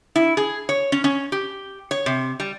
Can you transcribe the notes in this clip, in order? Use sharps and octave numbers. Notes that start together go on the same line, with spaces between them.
E4
G#4
C#5
C#4
C#4
G4
C#5
C3
G3